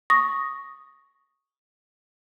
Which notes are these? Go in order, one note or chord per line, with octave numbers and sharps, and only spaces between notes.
C#6 D#6 A#6